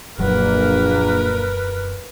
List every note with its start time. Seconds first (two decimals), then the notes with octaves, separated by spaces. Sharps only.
0.18 E1 A#1 F#2 F#3 A#3 A#4 B4